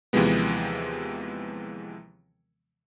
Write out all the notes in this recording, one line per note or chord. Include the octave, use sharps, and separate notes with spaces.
D#2 C3 E3 F3 G#3 B3